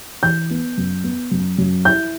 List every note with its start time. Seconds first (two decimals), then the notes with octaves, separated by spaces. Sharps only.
0.23 E3 G6
0.51 B3
0.78 F#2
1.04 B3
1.31 F#2
1.58 F#2
1.85 E4 G6